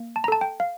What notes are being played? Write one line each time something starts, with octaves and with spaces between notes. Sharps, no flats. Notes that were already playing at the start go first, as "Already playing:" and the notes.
Already playing: A#3
A5
A#5
A4 A5
G5
F5